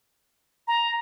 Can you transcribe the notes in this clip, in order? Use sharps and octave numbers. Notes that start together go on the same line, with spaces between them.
A#5